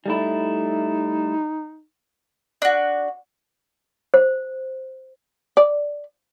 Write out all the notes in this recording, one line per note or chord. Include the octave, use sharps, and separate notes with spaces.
G3 A3 D#4 E4
D4 F#4
C5
D5